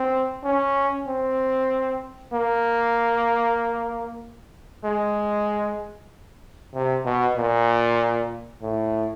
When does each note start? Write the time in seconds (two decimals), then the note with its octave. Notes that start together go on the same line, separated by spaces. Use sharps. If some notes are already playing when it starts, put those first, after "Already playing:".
Already playing: C4
0.45 C#4
1.07 C4
2.33 A#3
4.85 G#3
6.74 C3
7.05 B2
7.37 A#2
8.62 A2